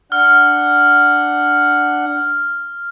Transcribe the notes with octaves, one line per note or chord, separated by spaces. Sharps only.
D4 F#5 F6